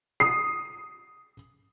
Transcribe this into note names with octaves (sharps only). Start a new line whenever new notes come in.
D#6 C7